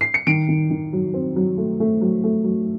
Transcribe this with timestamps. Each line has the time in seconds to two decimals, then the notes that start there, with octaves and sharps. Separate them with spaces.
0.01 C7
0.14 C#7
0.27 D#3 D7
0.49 D#3
0.70 D#3
0.93 F#3
1.14 C4
1.36 F#3
1.58 A3
1.80 A3
2.01 F#3
2.24 A3
2.44 F#3